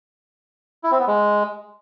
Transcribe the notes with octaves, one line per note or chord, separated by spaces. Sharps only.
E4
C4
B3
G#3